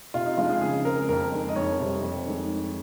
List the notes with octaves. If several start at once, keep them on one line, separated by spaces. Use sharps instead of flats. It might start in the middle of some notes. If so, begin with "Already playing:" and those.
C3 F4
D#4
F3 G#3 F4
G#4
C#3 G#4
G#3 C4 A#4
F2 A#4
D#3 G#3
D#5
F2 C#5
C3 G3 C4
F2
D#3 G#3